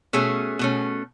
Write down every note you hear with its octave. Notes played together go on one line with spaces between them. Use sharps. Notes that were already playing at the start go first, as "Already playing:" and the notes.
B2 A3 C#4 G#4
B2 A3 C#4